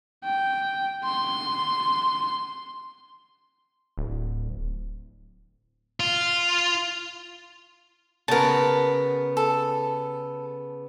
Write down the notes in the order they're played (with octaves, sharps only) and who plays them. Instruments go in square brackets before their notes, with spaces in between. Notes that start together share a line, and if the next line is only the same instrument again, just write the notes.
[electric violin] G5
C6
[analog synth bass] D1
[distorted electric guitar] F4
[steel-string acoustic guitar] C#3 B3 [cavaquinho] A#4 A5
[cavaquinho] A4